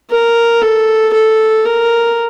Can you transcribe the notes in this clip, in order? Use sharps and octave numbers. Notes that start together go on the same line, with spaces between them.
A#4
A4
A4
A#4